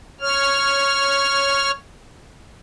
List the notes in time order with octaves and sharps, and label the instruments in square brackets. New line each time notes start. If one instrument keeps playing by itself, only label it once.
[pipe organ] C#5 F6